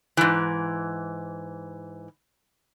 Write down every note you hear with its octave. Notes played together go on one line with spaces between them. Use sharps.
G#2 E3